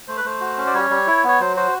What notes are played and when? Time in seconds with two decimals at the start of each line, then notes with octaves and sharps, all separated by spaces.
0.08 A3 C5
0.17 B4
0.25 A3 C5
0.41 F#4
0.58 C#4
0.66 D5
0.74 G3 C#5
0.90 G3
1.07 E4
1.24 B3 C#5
1.40 F#3 C5
1.56 F#4 C5